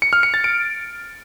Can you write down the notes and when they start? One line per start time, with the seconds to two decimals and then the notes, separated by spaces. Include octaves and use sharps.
0.02 C#7
0.13 F6
0.23 C#7
0.34 A6
0.44 D7